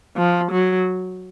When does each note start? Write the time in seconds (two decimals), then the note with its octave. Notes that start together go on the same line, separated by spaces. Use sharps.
0.16 F3
0.52 F#3